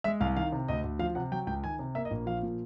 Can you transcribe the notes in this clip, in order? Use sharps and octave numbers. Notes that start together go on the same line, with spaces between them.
G#3 E5
C2 F5
D#3 F5
C3
D2 D#5
D2
F3 F5
C3 F#5
F#3 G5
C#2 G5
D#3 G#5
C3
A#3 E5
D#5
A#1
F3 F5
A#2